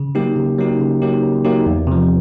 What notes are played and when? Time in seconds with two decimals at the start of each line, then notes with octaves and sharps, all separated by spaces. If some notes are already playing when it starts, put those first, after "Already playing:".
Already playing: C#3
0.15 F#3 A#3 D#4 G4
0.36 C#3
0.58 F#3 A#3 D#4 G4
0.80 C#3
1.02 F#3 A#3 D#4 G4
1.22 C#3
1.45 F#3 A#3 D#4 G4
1.66 E2
1.87 C3 F3